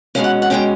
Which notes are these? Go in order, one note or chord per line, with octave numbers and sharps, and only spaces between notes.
B2 G#3 C#4 F5
F#5
F#5
B2 G#3 C#4 G5